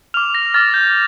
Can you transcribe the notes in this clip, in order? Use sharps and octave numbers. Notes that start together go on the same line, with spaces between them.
D6 F6 F7
A#6
D6 F6 A6
G6